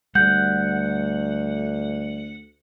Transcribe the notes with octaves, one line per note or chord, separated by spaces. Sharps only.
D2 G3 F#5 G6